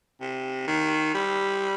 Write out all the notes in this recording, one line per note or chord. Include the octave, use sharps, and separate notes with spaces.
C3
D#3
G3